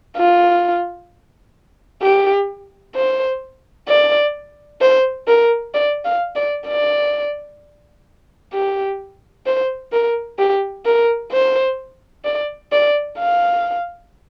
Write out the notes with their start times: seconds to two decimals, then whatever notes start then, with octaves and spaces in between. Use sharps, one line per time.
0.17 F4
2.03 G4
2.96 C5
3.88 D5
4.81 C5
5.28 A#4
5.74 D5
6.05 F5
6.36 D5
6.68 D5
8.53 G4
9.46 C5
9.93 A#4
10.39 G4
10.86 A#4
11.32 C5
12.25 D5
12.72 D5
13.19 F5